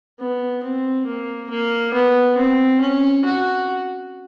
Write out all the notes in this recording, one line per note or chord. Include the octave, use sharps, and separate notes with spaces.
B3
C4
A#3
A#3
B3
C4
C#4
F#4